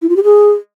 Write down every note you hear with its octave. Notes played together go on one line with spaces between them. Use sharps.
E4
F4
G4
G#4